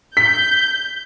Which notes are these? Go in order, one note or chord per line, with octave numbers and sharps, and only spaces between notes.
G6 B6